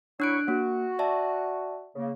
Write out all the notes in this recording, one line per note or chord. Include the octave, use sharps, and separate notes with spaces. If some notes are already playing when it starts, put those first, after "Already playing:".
F#3 D4 E4 C#6 F#6 D7
A#3 F#4
D5 E5 A5
C#3 A#3